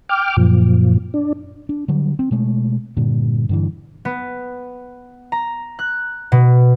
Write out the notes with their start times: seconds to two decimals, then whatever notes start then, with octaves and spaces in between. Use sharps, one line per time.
0.09 G5 D6 F6
0.37 F#2 A#2 F3
1.14 D4
1.69 D4
1.88 D3 F#3 G3
2.19 C4
2.31 B2 G#3 A3
2.97 G2 A#2 D3
3.49 G2 D3 E3
4.05 B3
5.32 A#5
5.79 F#6
6.32 B2